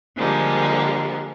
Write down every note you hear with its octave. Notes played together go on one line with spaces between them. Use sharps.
D3 F3 G3 G#3 A#3